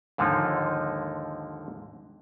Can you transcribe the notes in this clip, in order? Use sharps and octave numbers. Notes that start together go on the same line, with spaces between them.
D#2 G#2 D3 F3 A#3 D#4